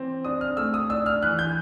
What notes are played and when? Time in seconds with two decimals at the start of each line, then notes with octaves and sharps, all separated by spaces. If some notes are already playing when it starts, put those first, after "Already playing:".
Already playing: E3 C4
0.25 D4 D#6
0.41 F6
0.57 A3 E6
0.74 D#6
0.90 D4 E6
1.06 F6
1.23 E3 F#6
1.39 G6